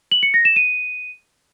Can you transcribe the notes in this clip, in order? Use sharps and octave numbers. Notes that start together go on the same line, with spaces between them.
F#7
C#7
A#6
E7
D#7